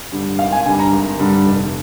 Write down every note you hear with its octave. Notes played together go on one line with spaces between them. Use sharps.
G2 D3 G3
G#1 F5
G#5
G2 D3 G3 G#5
A#5
G#1
G2 D3 G3
F1